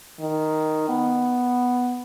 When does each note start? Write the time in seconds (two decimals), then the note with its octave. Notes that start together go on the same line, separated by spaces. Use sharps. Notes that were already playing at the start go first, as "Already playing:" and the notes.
0.20 D#3
0.89 B3